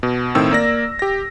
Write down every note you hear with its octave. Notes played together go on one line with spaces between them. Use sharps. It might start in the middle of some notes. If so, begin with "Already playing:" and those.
B2
A2 D#3 C4 E6
A#3 D5 A#6
G4 A#6